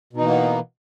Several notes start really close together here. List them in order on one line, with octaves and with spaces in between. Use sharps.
B2 D#4 E3 A#3 B3